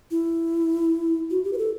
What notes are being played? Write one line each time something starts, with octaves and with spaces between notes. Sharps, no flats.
E4
F#4
G4
B4
A4